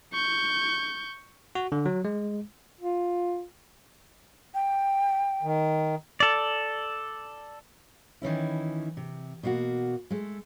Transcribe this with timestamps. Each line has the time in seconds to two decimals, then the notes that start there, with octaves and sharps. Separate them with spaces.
0.13 C#6 G6
1.55 F#4
1.72 D3
1.86 F#3
2.05 G#3
2.81 F4
4.54 G5
5.43 D#3
6.20 A4 D5
8.22 D#3 E3 C#4 E4
8.97 C3
9.43 B2 A#3 F#4
10.10 G#3 A3